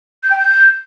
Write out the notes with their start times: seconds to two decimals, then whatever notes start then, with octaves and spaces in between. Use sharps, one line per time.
0.23 G6
0.31 G5
0.38 G6